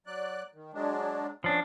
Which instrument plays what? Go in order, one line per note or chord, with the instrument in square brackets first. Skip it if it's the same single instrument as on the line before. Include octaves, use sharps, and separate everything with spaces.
[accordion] F#3 D5 F#6
D#3
F#3 G#3 D4
[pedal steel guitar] F3 D4 [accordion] B3 C#4